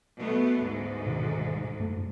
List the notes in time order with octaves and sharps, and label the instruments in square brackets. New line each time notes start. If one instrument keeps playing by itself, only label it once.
[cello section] B2 A3 B3
D2 G#2
[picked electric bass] B2 D#3
F#2 A3